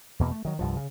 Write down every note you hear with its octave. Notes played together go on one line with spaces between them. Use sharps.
E2 B2 A#3
A3
D#3 F#3
C2 G2 F3
C#3